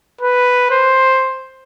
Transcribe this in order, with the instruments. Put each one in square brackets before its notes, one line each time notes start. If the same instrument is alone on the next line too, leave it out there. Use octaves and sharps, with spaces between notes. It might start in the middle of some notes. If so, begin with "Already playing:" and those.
[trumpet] B4
C5